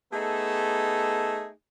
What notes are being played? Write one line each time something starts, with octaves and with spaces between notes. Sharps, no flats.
A3 B3 D#4 G#4 A4